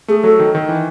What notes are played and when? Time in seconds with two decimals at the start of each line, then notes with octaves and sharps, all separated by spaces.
0.08 A3 G#4
0.24 F#3 A4
0.39 D#3
0.55 D#3
0.69 E3